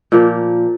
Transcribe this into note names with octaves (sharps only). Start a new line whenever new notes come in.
A#2 F3 A#3